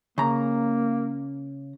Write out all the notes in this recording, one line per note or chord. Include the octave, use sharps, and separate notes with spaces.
C#3 A#3 A#5